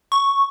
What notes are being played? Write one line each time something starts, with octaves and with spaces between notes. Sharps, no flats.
C#6